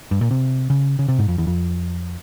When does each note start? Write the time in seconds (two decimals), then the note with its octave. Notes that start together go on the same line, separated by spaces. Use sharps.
0.11 G2
0.21 A#2
0.31 C3
0.70 C#3
0.99 C#3
1.08 C3
1.18 G#2
1.28 F2
1.38 E2
1.47 F2